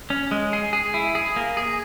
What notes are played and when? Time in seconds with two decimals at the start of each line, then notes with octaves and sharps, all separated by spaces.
0.10 C#4
0.31 G#3
0.53 G#4
0.73 G#4
0.94 E4
1.15 G#4
1.36 A#3
1.57 G#4